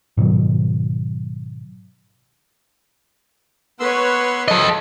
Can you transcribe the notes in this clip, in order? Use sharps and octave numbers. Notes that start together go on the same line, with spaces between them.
G#2 B2 D#3 F#3
B3 B4 C#5 C6 E6
A4 D#5